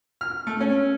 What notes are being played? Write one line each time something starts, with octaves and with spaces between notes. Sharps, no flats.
F6
A3
C#4